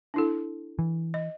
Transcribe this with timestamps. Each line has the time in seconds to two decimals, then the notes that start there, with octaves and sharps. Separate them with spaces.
0.14 D4 E4 A4
0.79 E3
1.14 D#5